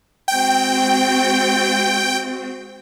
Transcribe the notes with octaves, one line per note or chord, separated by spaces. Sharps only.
G#3 C4 F#4 G5